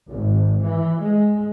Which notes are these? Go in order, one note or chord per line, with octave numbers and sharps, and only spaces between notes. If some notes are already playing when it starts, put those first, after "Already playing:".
G#1
E3
G#3